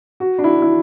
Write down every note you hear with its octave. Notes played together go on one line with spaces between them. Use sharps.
F#4
D4
E4
E4